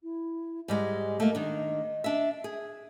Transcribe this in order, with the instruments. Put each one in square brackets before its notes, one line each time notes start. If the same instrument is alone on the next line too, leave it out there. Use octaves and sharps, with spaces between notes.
[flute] E4
[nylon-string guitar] G#2 G3 G#3 [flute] D#5
[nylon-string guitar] A3 A#3
D#3 D4
D4 E5
G#4